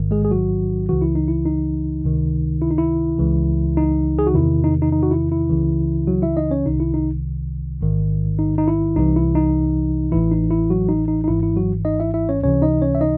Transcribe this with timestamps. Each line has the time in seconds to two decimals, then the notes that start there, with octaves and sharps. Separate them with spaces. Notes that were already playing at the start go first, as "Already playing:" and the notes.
Already playing: A1 G#2 D#3
0.11 G#3 G#4
0.25 G#4
0.30 F#3 F#4
0.89 C#2 C#3 E3 F#4
1.02 E4
1.15 D#4
1.28 E4
1.46 D#4
2.04 C#2 C3 D#3
2.62 E4
2.71 D#4
2.78 E4
3.19 C#2 C#3 E3
3.77 D#4
4.19 G#4
4.27 F#4
4.34 E2 C3 D#3 E4
4.64 D#4
4.82 D#4
4.92 D#4
5.03 F#4
5.11 E4
5.32 E4
5.50 C#2 C#3 E3
6.07 F#3 F#4
6.22 E4 E5
6.37 D#4 D#5
6.51 C#4 C#5
6.65 C2 C3 D#3 D#4
6.80 E4
6.94 D#4
7.81 A1 G#2 D#3
8.39 D#4
8.58 D#4
8.68 E4
8.96 C2 C3 E3 D#4
9.16 E4
9.35 D#4
10.12 A1 A2 E3 E4
10.31 D#4
10.51 E4
10.70 F#3 F#4
10.89 D#4
11.08 D#4
11.24 D#4
11.27 G#1 G#2 E3 E4
11.43 E4
11.56 F#3 F#4
11.85 D#4 D#5
12.00 E4 E5
12.14 E4 E5
12.29 C#4 C#5
12.43 C#2 C3 E3 C#4 C#5
12.62 D#4 D#5
12.82 C#4 C#5
12.95 E5
13.01 D#4 D#5